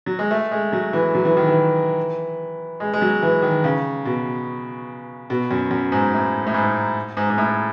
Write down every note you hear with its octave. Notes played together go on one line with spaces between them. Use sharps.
F#3
G#3
A3
G#3
F#3
E3
F#3
E3
D#3
E3
G#3
G#3
F#3
E3
D#3
C#3
B2
B2
F#2
F#2
G#2
A2
A2
G#2
G#2
G#2
A2